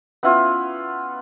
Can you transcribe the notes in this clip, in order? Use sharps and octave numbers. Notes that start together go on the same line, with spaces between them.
B3 C#4 E4 F4